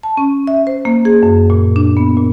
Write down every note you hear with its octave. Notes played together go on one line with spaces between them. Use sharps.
A5
C#4
E5
C5
A#3
G#4
F#2
A#2
D4
B3
A#2